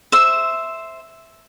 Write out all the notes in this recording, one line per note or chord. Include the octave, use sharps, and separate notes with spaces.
C5 E5